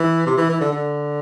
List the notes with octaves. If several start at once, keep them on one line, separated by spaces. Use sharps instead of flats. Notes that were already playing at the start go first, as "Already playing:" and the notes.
Already playing: E3
C3
E3
E3
D3
D3